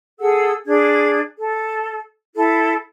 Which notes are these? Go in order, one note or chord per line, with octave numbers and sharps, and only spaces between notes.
G#4 A4 F#5 E6
D4 G#4 G#6
A4
E4 A4